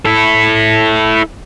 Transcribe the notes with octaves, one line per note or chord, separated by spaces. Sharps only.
E4 A4